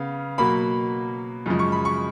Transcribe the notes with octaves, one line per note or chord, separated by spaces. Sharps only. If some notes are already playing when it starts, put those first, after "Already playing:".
Already playing: C#3 B3 F5
B2 F#3 A#3 B5
F#2 C#3 F3 G#3
C#6
B5
C#6